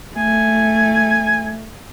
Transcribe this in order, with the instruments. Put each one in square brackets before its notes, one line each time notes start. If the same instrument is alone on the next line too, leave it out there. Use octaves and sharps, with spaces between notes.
[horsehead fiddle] A3 [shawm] G#5